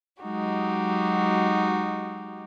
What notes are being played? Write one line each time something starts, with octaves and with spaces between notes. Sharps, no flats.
F#3 G#3 D#4 F#4 G4